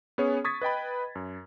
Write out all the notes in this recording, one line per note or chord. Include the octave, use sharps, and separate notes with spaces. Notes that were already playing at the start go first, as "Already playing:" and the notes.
B3 C#4 G#4 C#5
C#6 D#6 G#6 A6 B6
B4 D#5 G5 B5
F#2